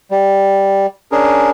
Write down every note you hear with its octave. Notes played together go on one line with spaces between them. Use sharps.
G3
C#4 D4 G#4 A#4